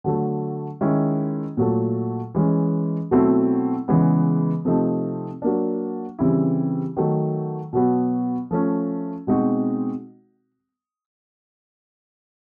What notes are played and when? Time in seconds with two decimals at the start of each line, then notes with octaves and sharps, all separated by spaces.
0.04 D3 F#3 A3
0.81 D#3 G#3 C#4 E4
1.57 A#2 F#3 A3
2.35 E3 G#3 C#4
3.11 B2 F#3 A3 C4 E4
3.88 C#3 E3 G#3 B3
4.65 C3 F3 A3 C4 D#4
5.42 F#3 A#3 D4
6.19 C#3 E3 G3 C4 E4
6.97 D#3 F#3 A3
7.73 B2 F#3 B3
8.51 F3 A3 C#4
9.27 B2 G#3 C4 D#4 F#4